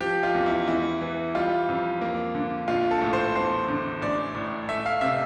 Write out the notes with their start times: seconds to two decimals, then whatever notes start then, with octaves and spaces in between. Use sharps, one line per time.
0.01 F3 G4
0.23 F4
0.35 E2
0.46 E4
0.68 E2 E4
1.01 E3
1.35 G3 F4
1.69 F2
2.01 A#3
2.35 D3
2.68 A#1 F4
2.91 A4
3.01 A2
3.13 C5
3.35 E2 C5
3.68 D3
4.02 A1 D5
4.35 A2
4.69 A3 E5
4.86 F5
5.01 C3 E5